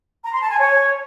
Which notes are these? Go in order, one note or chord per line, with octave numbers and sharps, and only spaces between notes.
A#5
C6
A5
G#5
C#5